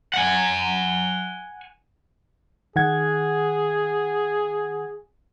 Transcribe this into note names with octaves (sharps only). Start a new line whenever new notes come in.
F#5 G#5
D#3 G#4 F#5 G#6